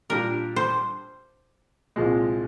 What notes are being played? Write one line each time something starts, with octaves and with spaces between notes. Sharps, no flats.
A#2 G3 D4 G4 A#4
C5
C2 A#2 F3 G#3